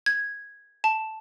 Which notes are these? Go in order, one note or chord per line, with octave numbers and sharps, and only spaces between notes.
G#6
A5